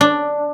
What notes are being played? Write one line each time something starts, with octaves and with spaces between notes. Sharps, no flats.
D4